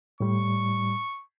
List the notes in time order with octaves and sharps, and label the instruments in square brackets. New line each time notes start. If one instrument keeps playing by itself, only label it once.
[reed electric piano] A2 G3 [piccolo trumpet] C#6